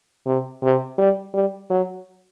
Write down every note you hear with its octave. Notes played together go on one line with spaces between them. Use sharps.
C3
C3
G3
G3
F#3